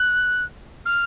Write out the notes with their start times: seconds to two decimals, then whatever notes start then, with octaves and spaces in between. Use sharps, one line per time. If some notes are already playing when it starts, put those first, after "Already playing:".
Already playing: F#6
0.85 F6